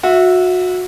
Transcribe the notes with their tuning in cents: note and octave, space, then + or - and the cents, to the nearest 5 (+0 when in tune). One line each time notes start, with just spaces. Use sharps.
F#4 -25 E5 +0